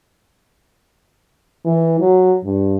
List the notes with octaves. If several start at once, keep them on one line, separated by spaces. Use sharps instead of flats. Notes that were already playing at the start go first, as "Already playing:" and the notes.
E3
F#3
G2